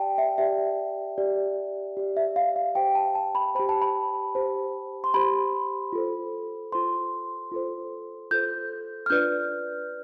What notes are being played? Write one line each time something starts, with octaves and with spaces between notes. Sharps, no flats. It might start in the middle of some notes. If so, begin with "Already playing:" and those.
Already playing: G4 D5 G5 A5
E5
G4 D5 E5
G4 D5
G4 D5
E5
F5
F5
G4 C5 G5
A5
A5
B5
G4 C5 B5
A5
B5
G4 C5
C6
G4 C5 B5
F4 A4 C5
F4 A4 C5 C6
F4 A4 C5
F4 A4 C5 G6
F6
D4 F4 B4 D5 G6